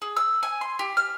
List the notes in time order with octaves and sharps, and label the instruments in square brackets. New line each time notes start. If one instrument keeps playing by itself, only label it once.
[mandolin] G#4
E6
G#5
C6
G4
F6